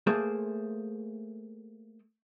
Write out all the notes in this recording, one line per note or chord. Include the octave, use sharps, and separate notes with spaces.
A3 A#3 G#4 C5